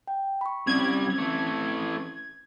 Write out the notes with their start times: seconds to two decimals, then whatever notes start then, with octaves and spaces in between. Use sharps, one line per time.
0.07 G5
0.41 B5 C#6
0.67 C2 G3 C4 C#4 G#6
1.18 E3 A3